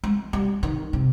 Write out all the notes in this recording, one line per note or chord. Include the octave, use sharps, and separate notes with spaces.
G#3
G3
D#3
C3